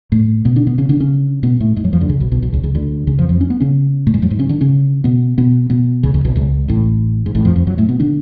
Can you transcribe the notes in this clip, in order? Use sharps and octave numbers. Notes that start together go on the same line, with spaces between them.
A2 A3
B2 B3
D3 D4
B2 B3
C#3 C#4
D3 D4
C#3 C#4
B2 B3
A2 A3
G#2 G#3
F#2 F#3
F2 F3
D2 D3
C#2 C#3
B1 B2
B1 B2
B1 B2
C#2 C#3
C#2 C#3
D2 D3
C#2 C#3
F2 F3
F2 F3
C#4
B3
C#3 C#4
A2 A3
G#2 G#3
F#2 F#3
G#2 G#3
C#3 C#4
D3 D4
C#3 C#4
B2 B3
B2 B3
B2 B3
C#2 C#3
C#2 C#3
B1 B2
C#2 C#3
A1 A2
G#2
A1 A2
F2 F3
F2 F3
F#2 F#3
A2 A3
B2 B3
D3 D4